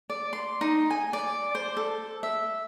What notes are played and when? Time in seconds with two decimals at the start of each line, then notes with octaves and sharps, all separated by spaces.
0.10 D5
0.33 C6
0.61 D#4
0.90 G#5
1.13 D5
1.55 C5
1.77 A4
2.23 E5